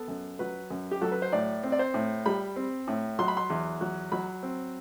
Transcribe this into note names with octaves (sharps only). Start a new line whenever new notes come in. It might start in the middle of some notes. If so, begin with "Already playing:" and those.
Already playing: B3 A4
F#2
F#3 B4
F#2
G4
F#3 A4
B4
C5
A2 D5
C4
D5
C5
A2
G3 B5
C4
A2
F#3 C6
B5
C6
E2
F#3
F#3 B5
C4